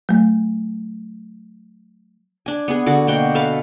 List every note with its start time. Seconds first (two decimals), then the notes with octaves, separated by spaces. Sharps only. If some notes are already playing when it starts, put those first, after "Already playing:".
0.09 F#3 A3
2.46 D4 G#5
2.68 B3 G#4
2.86 D3 F#4 A4
3.07 B2 A#3 F#4 G5
3.35 A4 B4 E5 F5